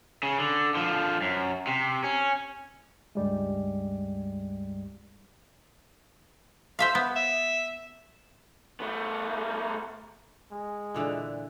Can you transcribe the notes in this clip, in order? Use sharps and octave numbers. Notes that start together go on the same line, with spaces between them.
C#3
D3
D3 F3
F#2
C3
C#4
C#2 G2 G3 G#3
C5 E5 F5
B3
E5
A3 B3
G#3
A#2 D3 E3